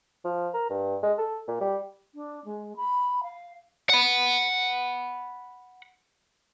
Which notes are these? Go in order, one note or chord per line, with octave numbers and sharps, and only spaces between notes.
F3
A#4
G2
G#3
A4
A#2
G3
D4
G#3
B5
F5
F#5 B5